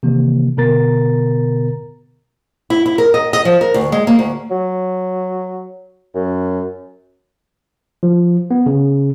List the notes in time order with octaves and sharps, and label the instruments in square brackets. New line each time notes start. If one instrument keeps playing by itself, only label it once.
[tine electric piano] C3 D#3 E3 A#3
B2 D3 B3 A#4 A#5 A6
[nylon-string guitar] E4
E4
A#4
D#5
D#5
F3
A#4
D2
G#3
A#3
D2
[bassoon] F#3
F#2
[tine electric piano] F3
B3
C#3